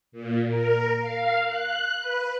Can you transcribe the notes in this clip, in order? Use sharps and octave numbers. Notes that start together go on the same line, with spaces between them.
A#2
A#4
F5
F#6
B4